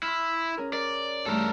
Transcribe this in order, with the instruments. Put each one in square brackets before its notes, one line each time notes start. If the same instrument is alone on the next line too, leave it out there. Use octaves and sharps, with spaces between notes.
[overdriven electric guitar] E4 [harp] C6 F6
[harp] C#4 G#4 A#4
[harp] A#4 [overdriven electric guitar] D5
[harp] G2 E3 A3 [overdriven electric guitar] A4 A#4